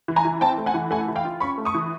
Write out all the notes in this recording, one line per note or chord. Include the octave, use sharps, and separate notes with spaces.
E3
G#5 A#5
E3
C4 G5 A5
A3
F#5 G#5
E3
A3 F#5 G#5
E3
F5 G5
F4
C#4 B5 C#6
A3
C#6 D#6
E3